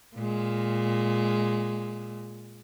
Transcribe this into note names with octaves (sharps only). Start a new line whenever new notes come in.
A#2 G#3